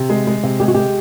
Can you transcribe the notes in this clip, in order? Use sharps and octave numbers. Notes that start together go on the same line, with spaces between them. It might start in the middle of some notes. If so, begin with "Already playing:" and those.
Already playing: C3
G#3
G#3
C3
G#3 G4
F#4
G#3 G4